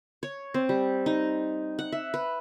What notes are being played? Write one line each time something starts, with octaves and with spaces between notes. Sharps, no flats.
C#5
C4
G3
D#4
F#5
E5
B4